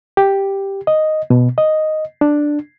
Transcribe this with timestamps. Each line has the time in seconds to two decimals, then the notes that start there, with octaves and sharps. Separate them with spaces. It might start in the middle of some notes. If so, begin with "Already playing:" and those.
0.17 G4
0.87 D#5
1.30 B2
1.58 D#5
2.21 D4